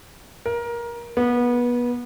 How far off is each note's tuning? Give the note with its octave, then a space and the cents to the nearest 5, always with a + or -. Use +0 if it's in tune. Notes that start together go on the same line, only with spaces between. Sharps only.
A#4 +20
B3 -25